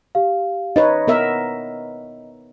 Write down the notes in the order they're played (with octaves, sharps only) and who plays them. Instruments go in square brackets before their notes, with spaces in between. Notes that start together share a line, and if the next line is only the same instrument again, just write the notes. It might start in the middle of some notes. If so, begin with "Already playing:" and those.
[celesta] G4 F5
[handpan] D#4 B4 C#5 [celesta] D#5
[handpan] B3 A#4 E5